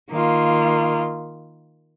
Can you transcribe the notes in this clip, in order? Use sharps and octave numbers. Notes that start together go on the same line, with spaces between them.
D#3 A#3 F4